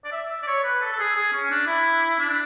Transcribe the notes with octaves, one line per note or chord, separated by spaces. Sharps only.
D5
E5
D5
C#5
B4
A4
A4
G#4
G#4
C#4
D4
E4
D4